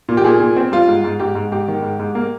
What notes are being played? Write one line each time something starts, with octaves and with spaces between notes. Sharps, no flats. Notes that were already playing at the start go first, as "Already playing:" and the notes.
A#2
G4
A#2 G#4
A#2
C4
G3 F4
G#2
G#2
G#2 G4
G#2
G#2 G4
D#3
G#2
G#2
A#3